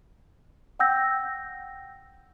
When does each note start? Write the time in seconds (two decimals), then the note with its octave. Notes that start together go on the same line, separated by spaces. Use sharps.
0.79 F#5 G5 E6 G6 A#6